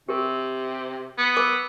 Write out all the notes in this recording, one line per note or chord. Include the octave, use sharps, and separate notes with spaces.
C3 G4 A#4
B3
A#4 D6